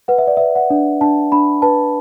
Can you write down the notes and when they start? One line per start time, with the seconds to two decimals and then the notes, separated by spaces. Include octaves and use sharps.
0.08 B4 F#5
0.18 E5
0.27 D5
0.37 B4 E5
0.56 F#5
0.70 D4
1.01 D4 A5
1.32 D4 B5
1.62 B4 A5